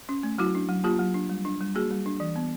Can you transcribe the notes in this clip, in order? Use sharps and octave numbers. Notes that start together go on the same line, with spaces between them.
C#4
A3
F#3 E4 F#4
D4
F#3
A#3 F4 G4
F#3
D4
G3
D4
G3
A#3 F#4 G#4
G3
D4
E3
B3